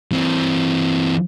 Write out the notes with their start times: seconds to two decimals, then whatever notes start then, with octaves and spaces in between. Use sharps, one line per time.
0.12 E3 C4